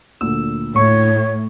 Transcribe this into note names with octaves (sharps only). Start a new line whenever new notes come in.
D2 A#2 D3 E6
A2 C#5 C#6